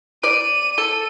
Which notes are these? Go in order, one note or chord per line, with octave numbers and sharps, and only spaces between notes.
D5 D#7
A4